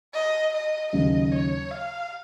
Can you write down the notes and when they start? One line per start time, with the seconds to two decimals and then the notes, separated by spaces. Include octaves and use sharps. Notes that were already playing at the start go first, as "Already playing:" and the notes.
0.14 D#5
0.53 D#5
0.93 D#2 C#3 F#3 D#5
1.32 C#5
1.71 F5